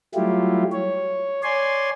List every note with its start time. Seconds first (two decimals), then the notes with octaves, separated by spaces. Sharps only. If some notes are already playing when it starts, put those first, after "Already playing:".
0.15 F#3 G3 A3 E4 F4 G4
0.72 C#5
1.43 C#5 D5 G#5 C6